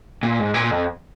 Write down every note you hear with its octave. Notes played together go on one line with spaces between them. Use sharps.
A#2
G#2
A#2
F2